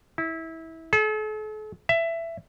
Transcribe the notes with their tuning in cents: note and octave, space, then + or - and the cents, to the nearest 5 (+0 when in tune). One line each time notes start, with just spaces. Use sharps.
E4 -25
A4 -45
E5 +15